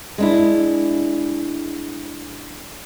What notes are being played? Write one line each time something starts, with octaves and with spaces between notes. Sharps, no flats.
G#3 D4 E4